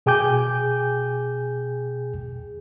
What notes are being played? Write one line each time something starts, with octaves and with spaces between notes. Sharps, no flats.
B2 G#4 G5 G#5 D6 G6